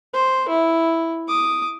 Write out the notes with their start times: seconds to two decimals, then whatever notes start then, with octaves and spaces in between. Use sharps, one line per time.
0.13 C5
0.49 E4
1.28 D6 D#6